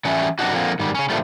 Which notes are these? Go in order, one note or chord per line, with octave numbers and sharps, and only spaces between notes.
E3 F#3 G3 A3 C#4 E4
F#2 C3 E3 D4 D#4 F#4
D3 F3 A#3 C4
G#2 D#3 G3
C#3 C#4
A#2 D3 F3 G3 A3